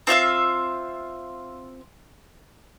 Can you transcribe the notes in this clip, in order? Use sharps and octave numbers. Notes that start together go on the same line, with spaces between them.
C4 F4 E5 F5